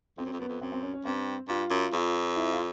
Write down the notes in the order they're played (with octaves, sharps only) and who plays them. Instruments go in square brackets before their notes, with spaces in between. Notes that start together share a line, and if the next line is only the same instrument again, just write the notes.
[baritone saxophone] F2 [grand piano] C4
[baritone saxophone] F#2
F2
[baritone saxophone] F#2 [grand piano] B3
[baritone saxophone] F2
[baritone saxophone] F#2 [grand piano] C4
[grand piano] C4
C#4
C#4
[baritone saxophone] G2 [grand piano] C4
[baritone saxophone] G2 [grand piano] F4
[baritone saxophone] F#2
F2
[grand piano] E4
F4